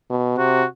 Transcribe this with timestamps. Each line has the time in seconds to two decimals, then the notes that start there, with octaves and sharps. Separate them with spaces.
0.10 B2
0.38 C3 F#4